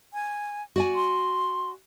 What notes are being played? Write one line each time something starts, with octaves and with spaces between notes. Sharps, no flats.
G#5
F#4 D5 G#5
C6